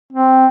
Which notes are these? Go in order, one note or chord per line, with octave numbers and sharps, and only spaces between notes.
C4